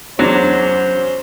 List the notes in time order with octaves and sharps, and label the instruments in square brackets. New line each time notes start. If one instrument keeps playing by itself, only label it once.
[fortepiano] E2 D4 [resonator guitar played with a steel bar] F#3 [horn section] C#4 C5